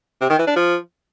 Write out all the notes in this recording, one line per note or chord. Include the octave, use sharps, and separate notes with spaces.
C3
D#3
E3
D4
F3